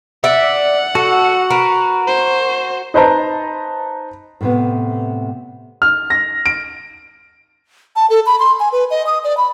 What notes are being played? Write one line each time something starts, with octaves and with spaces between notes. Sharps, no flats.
D5 E5 F#5
F#4 A4
A#4 B4
C5
D#4 B4 C5 A5 A#5
A2 C3 B3
F6
A#6
D7
A5
A4
B5
C6
G#5
B4
D#5
D#6
D5
B5